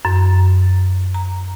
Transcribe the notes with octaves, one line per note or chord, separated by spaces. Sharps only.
F#2
A#5